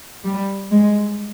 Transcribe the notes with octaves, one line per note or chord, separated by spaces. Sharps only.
G3
G#3